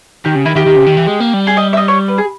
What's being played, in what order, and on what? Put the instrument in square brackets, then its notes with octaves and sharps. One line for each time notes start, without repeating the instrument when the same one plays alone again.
[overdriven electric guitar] D#3 [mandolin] G4
[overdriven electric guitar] C#3
[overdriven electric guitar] D#3 [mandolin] E4
[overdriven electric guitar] D#3 [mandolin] G4
[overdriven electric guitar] D#3
C#3
D#3
E3
G#3
A#3
G3
[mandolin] G#4
D#5
E5
D#5
C#5
B4
G#4